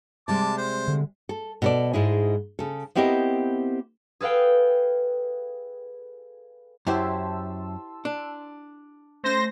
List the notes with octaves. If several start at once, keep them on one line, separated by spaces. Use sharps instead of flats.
C3 G3 G#3 A5 D6
C5
D3
A4
B2 A4 D5
G#2 G#3 E4 G#4
C#3 A4
B3 C4 E4 G4 A#4 D#5
G#4 A4 B4 F5 G5
F#2 E4 G4 C5 A5 C6 E6
D4
A3 C#4 C5 A#6 C7